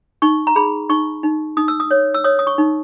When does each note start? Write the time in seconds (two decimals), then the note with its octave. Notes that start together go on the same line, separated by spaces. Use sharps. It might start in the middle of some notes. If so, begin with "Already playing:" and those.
0.22 D#4 C#6
0.47 A#5
0.56 G#4 B5
0.89 D#4 C#6
1.23 D#4
1.57 D#4 D#6
1.68 E6
1.80 D#6
1.91 C#5
2.14 E6
2.24 C#5 D#6
2.39 D#6
2.47 C#6
2.58 D#4